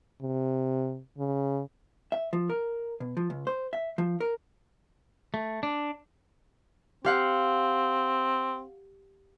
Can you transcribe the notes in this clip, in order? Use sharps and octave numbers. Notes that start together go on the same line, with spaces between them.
C3
C#3
E5
F3
A#4
B2
F3
C#2
C5
E5
F3
A#4
A3
D4
C4 G4 F5 F#5